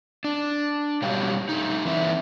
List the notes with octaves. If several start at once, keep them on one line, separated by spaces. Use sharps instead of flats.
D4
B2 F#3 G3 G4 C#5 F5
A3 D#4
E3 C4 B4 E5